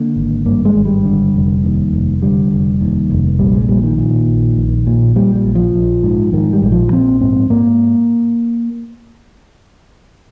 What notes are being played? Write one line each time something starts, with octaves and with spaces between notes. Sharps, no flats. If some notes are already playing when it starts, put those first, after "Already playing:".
Already playing: D3 A#3
G#1
G2 A#3
G#3
G#1
G3
D3
F1
D#2
F1
D3 G3
F1
D#2
F1
A#1 G3
G#3
A#2 G3
D#3
A#2
A#1
A#1
A#2
A#2 G3
G3
A#1
F3
A#1
G#2
G#2 D#3
G3
A#1
F3
A#1 C4
G#2 C4
G#2 A#3